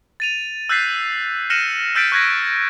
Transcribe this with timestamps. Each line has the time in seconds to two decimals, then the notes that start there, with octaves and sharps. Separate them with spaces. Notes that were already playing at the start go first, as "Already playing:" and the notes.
0.20 A6 D#7 F7
0.69 E6 F#6 G6 A6 B6 C7
1.50 F6 A#6 C#7 D#7 E7 F#7
1.95 E6 F6 G6 A6 B6 D7
2.12 C#6 F#6 G#6 A#6 B6